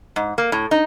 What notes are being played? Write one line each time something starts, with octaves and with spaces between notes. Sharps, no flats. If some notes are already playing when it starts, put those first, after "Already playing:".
G#2
A#3
A2
D#4